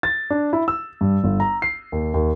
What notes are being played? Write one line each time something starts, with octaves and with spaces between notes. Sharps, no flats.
A6
D4
E4
E6
G2
G1
A#5
C7
D#2
D#2